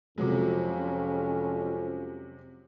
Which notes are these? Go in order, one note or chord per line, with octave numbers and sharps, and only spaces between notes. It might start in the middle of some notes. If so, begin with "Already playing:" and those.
F2 C3 F#3 G#3 C#4